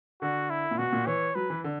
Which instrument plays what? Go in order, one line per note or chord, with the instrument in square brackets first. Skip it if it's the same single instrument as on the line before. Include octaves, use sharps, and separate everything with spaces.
[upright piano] D3 [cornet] F#4
[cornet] E4
[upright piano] A#2
[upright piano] B2 [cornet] F#4
[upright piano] A#2
[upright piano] E3 [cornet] C#5
[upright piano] F#3 [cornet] B4
[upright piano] E3
D3